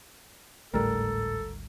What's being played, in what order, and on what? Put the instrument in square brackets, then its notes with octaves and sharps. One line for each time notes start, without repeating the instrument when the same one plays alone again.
[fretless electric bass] G#1 D2 G3 [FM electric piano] A2 [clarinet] A4 [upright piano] A#4